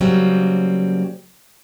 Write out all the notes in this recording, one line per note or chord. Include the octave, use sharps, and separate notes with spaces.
C#3 F#3 G3 A#3 C4